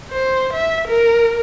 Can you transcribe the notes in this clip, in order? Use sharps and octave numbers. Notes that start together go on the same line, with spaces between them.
C5
E5
A#4